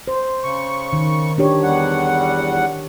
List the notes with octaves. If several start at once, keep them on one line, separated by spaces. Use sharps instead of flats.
C5
C#3 C#6
D#3
D4 G4 C#5
E2 G3 F#5